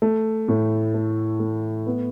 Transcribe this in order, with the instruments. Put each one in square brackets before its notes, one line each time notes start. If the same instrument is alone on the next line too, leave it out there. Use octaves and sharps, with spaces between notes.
[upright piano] A3
A2
A3
A3
B3